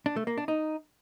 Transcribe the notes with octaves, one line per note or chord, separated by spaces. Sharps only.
D4
A3
A#3
D4
D#4